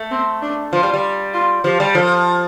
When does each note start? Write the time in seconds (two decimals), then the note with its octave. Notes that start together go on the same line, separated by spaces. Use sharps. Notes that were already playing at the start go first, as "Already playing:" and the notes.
Already playing: A3
0.11 C4
0.42 D4
0.72 F3 F4
0.83 G3
0.94 G3
1.34 F4
1.64 F3 G4
1.80 G3
1.95 F3 A4